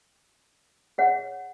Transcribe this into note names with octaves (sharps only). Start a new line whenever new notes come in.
G#4 C#5 F#5